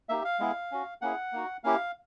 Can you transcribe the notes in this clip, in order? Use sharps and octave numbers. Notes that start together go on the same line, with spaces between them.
A#3 D#4 G4 E5
F5
G#3 B3 E4 G#4
C#4 F#4
A#3 C#4 E4 G#4 F#5
A#3 D#4 F#4
A#3 C#4 E4 G4 F5